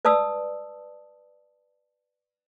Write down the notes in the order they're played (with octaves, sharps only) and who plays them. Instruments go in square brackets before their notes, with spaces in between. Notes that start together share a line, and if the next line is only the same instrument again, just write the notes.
[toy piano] B4 D5 A5 D#6 E6